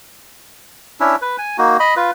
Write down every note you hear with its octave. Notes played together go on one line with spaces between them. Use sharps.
C#4 D4 E4
B4
G#5
A#3 D#4 F#4
D#5 B5
F4 B4